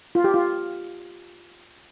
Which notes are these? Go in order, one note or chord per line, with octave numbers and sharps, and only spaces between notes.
F4
G4
F4